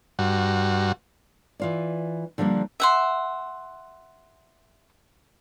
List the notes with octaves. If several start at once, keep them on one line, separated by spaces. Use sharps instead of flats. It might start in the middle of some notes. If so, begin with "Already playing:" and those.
G2 F#4
E3 F4 D5
D3 F3 G3 A#3 D4
E5 F#5 C6